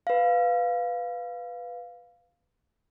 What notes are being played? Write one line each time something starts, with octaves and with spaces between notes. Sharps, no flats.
B4 F5